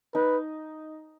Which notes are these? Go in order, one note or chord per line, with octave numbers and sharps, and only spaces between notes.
D#4 B4